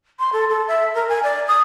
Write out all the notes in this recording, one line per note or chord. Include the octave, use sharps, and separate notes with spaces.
C6
A4
A4
E5
A#4
G#5
D5
D#6